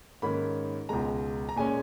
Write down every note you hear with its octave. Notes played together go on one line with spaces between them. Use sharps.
G#2 D#3 A#3 C#4 B5
C#2 B2 G#3 A#5
A#5
A#2 G#3 C#4 G#5